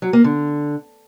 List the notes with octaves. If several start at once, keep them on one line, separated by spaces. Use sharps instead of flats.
F#3
A#3
D3